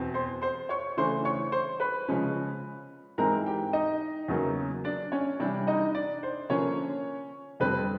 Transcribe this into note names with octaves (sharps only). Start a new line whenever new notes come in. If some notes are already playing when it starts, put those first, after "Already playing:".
Already playing: E2 B2 C4
C5 C6
C5 C6
C#5 C#6
C#3 E3 A3 D4 C5 C6
C#5 C#6
C5 C6
B4 B5
C#3 F3 G#3 C#4
G#2 E3 G#3 C4 A#4 A#5
G4 G5
D#4 D#5
E2 C#3 F#3 A#3 C#4
D4 D5
C#4 C#5
C3 E3 G3 D4 D5
D#4 D#5
D4 D5
C5
D3 F3 A#3 C#4 C#5
F2 D3 G3 C4 B4